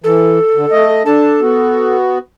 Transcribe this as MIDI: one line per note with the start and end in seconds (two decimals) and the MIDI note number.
0.04 0.39 52
0.04 0.87 69
0.55 0.66 50
0.71 1.03 57
0.71 1.03 75
1.06 1.40 62
1.06 1.97 69
1.06 1.40 81
1.41 2.18 59
1.41 2.18 66